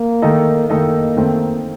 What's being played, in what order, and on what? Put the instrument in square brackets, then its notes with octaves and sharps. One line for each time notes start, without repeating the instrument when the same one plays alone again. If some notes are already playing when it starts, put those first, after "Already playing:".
Already playing: [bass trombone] A#3
[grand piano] D#3 A3 D#4 A4 D#5
[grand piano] D#3 A3 D#4 A4 D#5 [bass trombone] A#3
[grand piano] D#3 A3 C4